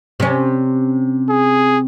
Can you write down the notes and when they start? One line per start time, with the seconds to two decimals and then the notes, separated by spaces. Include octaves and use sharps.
0.20 C3 C#4
1.29 G#4